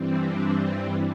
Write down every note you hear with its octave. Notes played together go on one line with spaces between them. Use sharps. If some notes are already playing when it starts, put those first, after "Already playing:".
Already playing: G2 E3 G3 C4
D4
C4